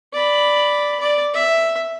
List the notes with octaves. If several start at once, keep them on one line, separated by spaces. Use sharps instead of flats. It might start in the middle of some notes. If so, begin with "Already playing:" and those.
D5 B5
D5
E5